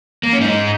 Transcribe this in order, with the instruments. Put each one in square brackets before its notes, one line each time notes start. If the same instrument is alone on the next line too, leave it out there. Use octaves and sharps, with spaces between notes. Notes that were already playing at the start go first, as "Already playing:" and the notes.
[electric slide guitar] A#3
C#4
G#2 D#4